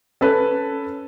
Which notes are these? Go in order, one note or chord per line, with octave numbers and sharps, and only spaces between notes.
C#4 A4 B4